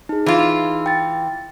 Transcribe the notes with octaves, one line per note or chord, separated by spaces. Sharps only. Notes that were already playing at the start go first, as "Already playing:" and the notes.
D#4 G#4
E3 F4
G5 A6